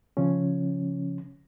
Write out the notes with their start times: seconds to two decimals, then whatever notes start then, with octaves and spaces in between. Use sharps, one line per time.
0.17 C#3 F3 C#4